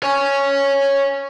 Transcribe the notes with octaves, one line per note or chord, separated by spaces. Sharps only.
C#5 G#5